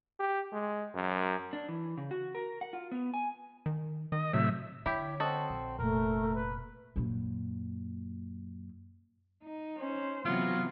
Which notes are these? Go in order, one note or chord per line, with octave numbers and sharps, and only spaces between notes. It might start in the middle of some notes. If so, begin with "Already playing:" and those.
G4
G#3
F#2
D4
E3
C#3
F#4
A#4
F#5
F4
B3
G#5
D#3
D#3 D#5
A2 C3 F#3 E5
D3 E4 G4 C#5
C4 F#4 A4 D#5
A#1
F1 A#2 A3 A#4
B4
F#2 A#2
D#4
C#4 C5
C3 E3 F#3 B3 F4